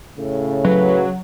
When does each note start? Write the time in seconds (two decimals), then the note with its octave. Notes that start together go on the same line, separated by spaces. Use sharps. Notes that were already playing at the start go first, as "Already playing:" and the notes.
0.19 A2 C#3
0.65 F#3 B4